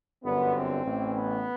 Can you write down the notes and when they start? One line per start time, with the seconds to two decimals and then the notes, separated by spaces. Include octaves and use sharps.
0.24 G1 F#2 D3 B3
0.55 C4
0.85 A1 A2 E3
1.16 B3